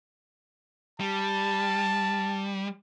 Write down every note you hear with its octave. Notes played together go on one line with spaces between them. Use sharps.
G3 A5